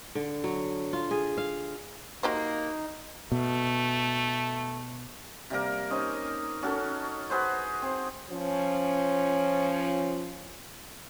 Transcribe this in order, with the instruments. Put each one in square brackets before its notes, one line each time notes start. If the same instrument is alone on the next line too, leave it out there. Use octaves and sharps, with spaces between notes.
[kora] D3
F#3
F4
G#4
F5
[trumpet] A#3 [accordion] D#4 [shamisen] F#4 G4 C5
[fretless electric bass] B2 [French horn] A3
[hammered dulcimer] C3 G3 A#3 A#4
C#4 D#4 C5 D#5
C#4 F#4 A4
F#4 G#4 B4 C5
C4
[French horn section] F3 C#4